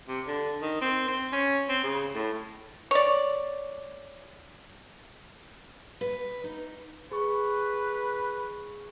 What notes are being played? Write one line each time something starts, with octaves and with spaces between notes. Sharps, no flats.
C3
D3
D#3
C4
C4
C#4
C4
C#3
A2
C#5 D5
B4
D#4
G#4 B4 C#6